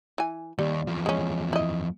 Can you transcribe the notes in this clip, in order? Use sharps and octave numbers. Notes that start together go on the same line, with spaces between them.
E3 G#5
D#2 G3
E2 F3
G#3 C#4
E4 D#5